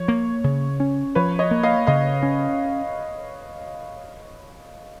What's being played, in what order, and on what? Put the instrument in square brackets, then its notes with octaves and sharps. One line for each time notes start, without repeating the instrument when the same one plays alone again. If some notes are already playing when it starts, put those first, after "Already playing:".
Already playing: [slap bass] F3 [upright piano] C#5
[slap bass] A#3
C#3
C#4
[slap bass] F3 [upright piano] B4 C#5
[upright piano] C#5 D#5
[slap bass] A#3
[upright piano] D#5 F5
[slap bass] C#3 [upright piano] D#5 F5
[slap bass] C#4